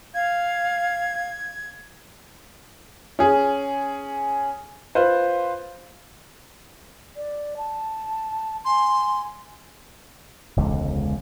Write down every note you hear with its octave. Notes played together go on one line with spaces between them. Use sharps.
F5 G#6
C#4 G#4
F4 B4 C5
D5
A5
G#5 C6
E1 C#2 D3